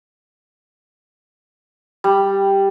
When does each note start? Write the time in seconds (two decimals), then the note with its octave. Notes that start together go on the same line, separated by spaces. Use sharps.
2.04 G3